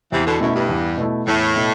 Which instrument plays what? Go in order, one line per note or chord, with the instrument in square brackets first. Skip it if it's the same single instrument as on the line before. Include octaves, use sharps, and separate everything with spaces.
[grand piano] E2 [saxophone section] C3 E3
[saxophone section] B2 D3
[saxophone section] F#2 [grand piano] B2 A3 E4
[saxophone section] G2
[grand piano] E2
B2 A3 E4
[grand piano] E2 [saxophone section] A2
[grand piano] B2 A3 E4